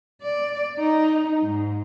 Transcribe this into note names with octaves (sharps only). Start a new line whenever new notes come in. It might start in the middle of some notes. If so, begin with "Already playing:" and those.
D5
D#4
G#2